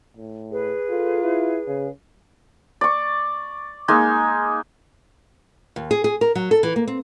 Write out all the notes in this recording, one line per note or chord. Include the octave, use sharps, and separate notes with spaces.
A2
G#4 B4
F4 A4
E4
C#3
D5 C#6
G#3 A#3 D#4 G#5
D#2
G#4
G#4
A#4
F#3
A4
E3
A#3
C4